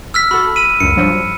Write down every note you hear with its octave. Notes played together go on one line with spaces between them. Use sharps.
E6 F6 B6
F#4 A4 B5
B5 D#7
C#2 F#2 C#7
G2 F3 F#3